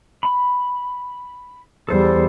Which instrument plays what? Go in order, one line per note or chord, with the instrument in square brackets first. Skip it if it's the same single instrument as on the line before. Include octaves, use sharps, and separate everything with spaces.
[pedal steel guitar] B5
[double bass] E2 G3 [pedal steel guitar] A4 C5